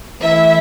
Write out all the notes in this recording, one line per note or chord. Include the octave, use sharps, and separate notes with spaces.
E3 A3 E4 E5